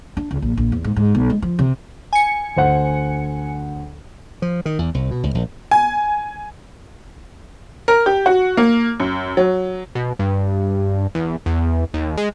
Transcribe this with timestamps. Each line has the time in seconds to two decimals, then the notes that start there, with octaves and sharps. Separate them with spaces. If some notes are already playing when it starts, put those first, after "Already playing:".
0.17 D4
0.31 C#2
0.42 A#1
0.57 A#1
0.72 E2
0.84 G#2
0.96 G#2
1.15 B1
1.30 G#3
1.42 F3
1.59 C3
2.13 G#5 C#7
2.57 D2 C5 F#5
4.42 F3
4.65 D#3
4.79 E2
4.94 C2
5.11 B2
5.23 C#2
5.35 A#1
5.71 G#5
7.88 A#4
8.06 G4
8.26 F#4
8.57 A#3
9.00 F#2
9.37 F#3
9.95 B2
10.19 G2
11.15 E2
11.46 E2
11.94 D#2
12.17 G#3